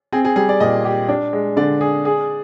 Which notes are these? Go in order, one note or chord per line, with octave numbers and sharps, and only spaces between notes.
C4 G#4
G#4
G3 G#4
D5
A#2 D#5
G4
D4
G#3
D3 D5
G#4
G#4